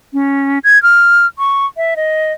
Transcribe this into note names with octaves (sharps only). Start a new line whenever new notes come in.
C#4
G#6
F6
C#6
E5
D#5